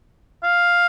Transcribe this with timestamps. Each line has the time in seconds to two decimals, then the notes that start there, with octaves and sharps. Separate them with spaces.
0.43 F5